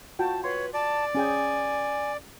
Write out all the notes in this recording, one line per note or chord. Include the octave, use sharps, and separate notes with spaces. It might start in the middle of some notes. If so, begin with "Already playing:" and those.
F4 F#4 G5 A5
B4 C#5 C6
D5 A5
C#4 G#4 G5 G#5